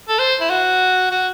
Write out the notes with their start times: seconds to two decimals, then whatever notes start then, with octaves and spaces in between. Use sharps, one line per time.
0.09 A4
0.19 C5
0.41 E4
0.50 F#4
1.11 F#4